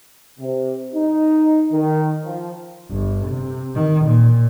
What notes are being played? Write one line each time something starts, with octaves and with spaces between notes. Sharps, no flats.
C3
D#4
D#3
F3
G1
C3
D#3
A#2